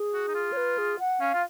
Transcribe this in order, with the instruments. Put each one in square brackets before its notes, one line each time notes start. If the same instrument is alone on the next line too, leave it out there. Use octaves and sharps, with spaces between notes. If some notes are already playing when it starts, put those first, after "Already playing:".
Already playing: [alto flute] G#4
[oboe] F#4
D#4
F4
[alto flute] C#5
B4
G#4
F#5
[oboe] C#4 [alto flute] F5
[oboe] F4